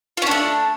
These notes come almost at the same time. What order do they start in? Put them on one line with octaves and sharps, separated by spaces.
F4 C#4 D4 A3